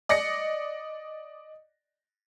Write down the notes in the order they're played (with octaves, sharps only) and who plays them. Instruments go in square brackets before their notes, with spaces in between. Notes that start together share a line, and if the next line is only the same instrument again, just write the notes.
[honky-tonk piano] D5 D#5 A#6 C#7